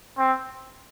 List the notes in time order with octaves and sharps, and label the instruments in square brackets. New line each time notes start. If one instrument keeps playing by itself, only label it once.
[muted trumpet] C4